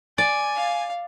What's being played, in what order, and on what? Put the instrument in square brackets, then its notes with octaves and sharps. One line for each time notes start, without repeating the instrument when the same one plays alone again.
[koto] D5 [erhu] G#5
[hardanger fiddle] F5